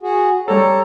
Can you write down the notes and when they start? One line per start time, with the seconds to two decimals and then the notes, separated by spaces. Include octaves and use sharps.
0.02 F#4 G#4
0.48 G3 A4 C#5 A#5